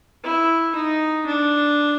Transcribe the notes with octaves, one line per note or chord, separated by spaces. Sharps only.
E4
D#4
D4